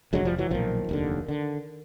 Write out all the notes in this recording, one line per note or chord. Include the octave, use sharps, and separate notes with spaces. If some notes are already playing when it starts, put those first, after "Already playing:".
F1 D#2 D3 F#3 G#3
F3 G3
E3 F#3
B1 A#2 D#3 F3
F1 D#2 D3
D3